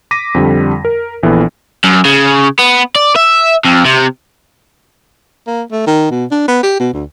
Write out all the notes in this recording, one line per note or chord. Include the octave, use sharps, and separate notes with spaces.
D6 A#6 B6 D#7
F2 D3 G3
A#4
A#1 E3 B3 A4
F#2
C#3
B3
D5
E5
F2
C3
A#3
A3
D#3
B2
D4
B3
G4
B2
D2